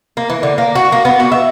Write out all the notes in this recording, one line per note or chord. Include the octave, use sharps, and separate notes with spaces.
A#3
E3
D3
A#3
F#4
A#3
B3
F#4
E5